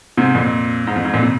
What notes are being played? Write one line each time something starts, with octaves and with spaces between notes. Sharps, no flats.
G#2 C3
F2 A#2
G#2
F2
G#2
F2 A#2
C3